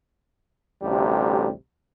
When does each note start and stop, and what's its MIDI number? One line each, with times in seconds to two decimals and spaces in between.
0.82 1.51 33
0.82 1.51 38
0.82 1.51 48
0.82 1.51 55